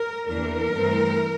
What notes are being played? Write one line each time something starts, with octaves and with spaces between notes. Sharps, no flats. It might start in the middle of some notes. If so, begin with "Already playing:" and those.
Already playing: A#4
E2 E3 A#3 D4 A#4
G2 E3 A3 C4